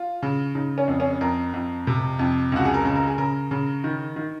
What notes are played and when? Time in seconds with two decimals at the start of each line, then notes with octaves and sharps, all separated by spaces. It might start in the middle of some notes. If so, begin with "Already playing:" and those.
Already playing: F4
0.22 C#3
0.55 C#3 D#4
0.78 C#4
0.88 F2
1.00 C#4
1.21 F2 A#4
1.54 F2
1.87 C3
2.19 F2
2.52 C#2 F#4
2.65 G#4
2.74 A#4
2.85 C#3
2.96 A#4
3.07 G#4
3.18 C#3 A#4
3.51 C#3
3.84 D#3
4.16 D#3